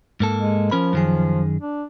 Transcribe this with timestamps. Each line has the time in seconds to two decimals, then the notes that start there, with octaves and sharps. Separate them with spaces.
0.20 G#2 A#3 A4
0.41 G#3
0.71 F3 C#4 A#4 B5
0.93 F#2 D#3 G#4
1.61 D4